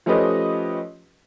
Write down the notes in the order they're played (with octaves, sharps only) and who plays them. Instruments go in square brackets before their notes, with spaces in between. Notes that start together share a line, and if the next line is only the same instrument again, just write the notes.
[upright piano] F3 A3 C#4 G4 B4 D#5